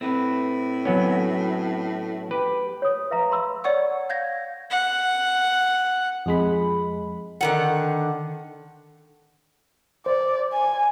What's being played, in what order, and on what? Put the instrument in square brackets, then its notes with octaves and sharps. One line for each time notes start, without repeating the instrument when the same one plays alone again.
[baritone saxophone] A2 [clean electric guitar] C4 B4
[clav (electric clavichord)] F#3 B3 C#4
[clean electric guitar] G4 [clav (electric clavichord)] B4
[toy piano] C#5 D#6
B4 E5 F5 A#5
B5 C6 E6
[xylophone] C#5 D5 F#5 C#6 E6
F5 G6 G#6 A#6
[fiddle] F#5
[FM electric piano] F2 G#3 B5
[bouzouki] D3 D#3 F#5
[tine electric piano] C5 [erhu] D5
[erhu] G#5